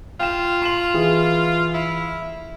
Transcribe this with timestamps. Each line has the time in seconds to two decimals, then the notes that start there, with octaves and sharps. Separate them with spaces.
0.20 F4 G5 E7
0.62 C6 E7 F#7
0.94 E3 G#4
1.74 E4